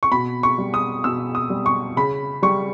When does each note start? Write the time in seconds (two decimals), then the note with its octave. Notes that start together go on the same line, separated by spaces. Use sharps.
0.03 C#6
0.12 B2 B5
0.43 C#6
0.58 G3
0.74 D#6
1.04 B2 E6
1.35 D#6
1.50 G3
1.66 C#6
1.97 C#3 B5
2.42 G3 C#6